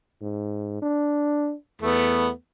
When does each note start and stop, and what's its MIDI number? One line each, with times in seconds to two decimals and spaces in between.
0.21 0.78 44
0.82 1.53 62
1.82 2.30 40
1.82 2.29 57
1.82 2.29 59